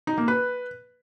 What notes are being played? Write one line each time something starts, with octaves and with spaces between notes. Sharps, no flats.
D#4
A#3
B4